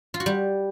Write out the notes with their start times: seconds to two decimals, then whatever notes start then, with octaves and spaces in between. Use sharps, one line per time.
0.14 F4
0.20 F#4
0.26 G3